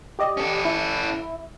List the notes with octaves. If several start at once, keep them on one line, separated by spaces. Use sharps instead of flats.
G4 D5 D#5
C#4 A4
E4